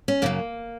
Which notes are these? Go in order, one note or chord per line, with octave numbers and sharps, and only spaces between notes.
C#4
F#2 C#3 F#3 A#3